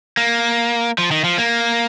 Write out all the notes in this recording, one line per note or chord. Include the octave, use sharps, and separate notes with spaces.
A#3
F3
D#3
F3
A#3